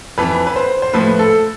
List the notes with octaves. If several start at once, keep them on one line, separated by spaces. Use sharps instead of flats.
F2 E3 B4
B4
C5
C5
A2 F3 B4
A4